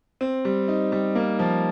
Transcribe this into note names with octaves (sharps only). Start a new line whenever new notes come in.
C4
G3
D#4
G3
A#3
F3